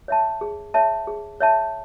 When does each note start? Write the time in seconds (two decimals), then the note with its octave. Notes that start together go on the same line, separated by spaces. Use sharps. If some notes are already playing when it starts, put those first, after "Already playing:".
0.08 C#5 E5 A5
0.41 G#4
0.74 C#5 E5 A5
1.07 G#4
1.40 C#5 E5 A5